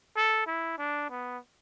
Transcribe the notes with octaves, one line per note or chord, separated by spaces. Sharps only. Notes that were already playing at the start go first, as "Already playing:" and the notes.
A4
E4
D4
B3